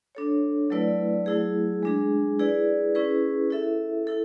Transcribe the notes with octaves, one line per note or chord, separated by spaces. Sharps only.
D4 A4 C#5
F#3 A3 E4 B4 D5
F#3 A3 E4 G#4
G#3 D4 G#4
E4 G#4 B4 D5
C#4 E4 G#4 B4
E4 A4 E5
E4 A4